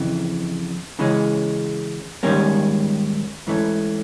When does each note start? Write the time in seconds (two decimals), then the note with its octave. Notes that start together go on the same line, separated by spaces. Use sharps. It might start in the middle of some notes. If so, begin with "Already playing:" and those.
Already playing: F2 C#3 E3
0.99 C#3 E3 G#3 C#4
2.23 G#2 D#3 G3 A#3 C#4
3.47 G#2 E3 A3 C#4